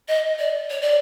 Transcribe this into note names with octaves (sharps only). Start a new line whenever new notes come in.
D#5
D5
C#5
D5